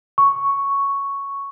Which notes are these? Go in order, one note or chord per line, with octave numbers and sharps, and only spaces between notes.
C#6